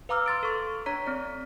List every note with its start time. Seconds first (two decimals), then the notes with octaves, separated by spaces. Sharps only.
0.09 B4 F5 A#5 D6 E6 F6
0.26 C6 A6 D7
0.43 A4 C#6
0.86 D4 C#5 A#5 B6
1.06 C4 D5